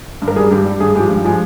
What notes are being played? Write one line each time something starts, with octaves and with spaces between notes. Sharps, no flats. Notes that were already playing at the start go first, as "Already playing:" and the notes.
G2
A#4
G3 G#4
G2 G4
G3
G2 G#4
F3 G#3 G4
G2
F3 G#3